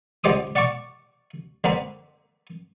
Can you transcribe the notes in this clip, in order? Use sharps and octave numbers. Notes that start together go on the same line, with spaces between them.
C#2 D3 G3 C5 D6 D#6
D5 F#5 A5 C#6 D6
D3 A#3 C4 B4